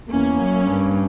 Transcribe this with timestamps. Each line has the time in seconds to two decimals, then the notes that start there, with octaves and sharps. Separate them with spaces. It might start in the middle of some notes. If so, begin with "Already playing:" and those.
0.10 E2 A#3 C#4
0.39 F#2
0.67 G2